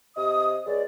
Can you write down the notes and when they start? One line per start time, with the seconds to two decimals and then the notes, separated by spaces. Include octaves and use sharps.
0.17 C3 D#5 D#6
0.65 C#2 D5